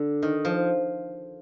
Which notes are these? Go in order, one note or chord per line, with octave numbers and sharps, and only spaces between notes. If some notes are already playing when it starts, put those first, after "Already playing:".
Already playing: D3
D#3
F3